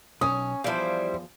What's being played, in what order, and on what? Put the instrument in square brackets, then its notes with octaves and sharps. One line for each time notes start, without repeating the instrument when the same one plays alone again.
[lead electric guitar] B1 [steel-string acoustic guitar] C#4 C#5 G#5 [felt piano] D#6
[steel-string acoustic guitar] E2 F3 [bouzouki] G3 E4 C5 [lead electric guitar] D5 F5